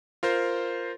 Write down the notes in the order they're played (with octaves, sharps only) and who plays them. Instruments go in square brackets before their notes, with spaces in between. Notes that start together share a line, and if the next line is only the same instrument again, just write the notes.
[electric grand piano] F4 A#4 C5